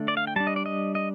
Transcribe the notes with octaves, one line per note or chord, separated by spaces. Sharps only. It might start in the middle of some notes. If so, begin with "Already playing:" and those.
Already playing: D3 A3 D4
D5
F5
G5
G3 D4 A5
D#5
D5
D#5
D#5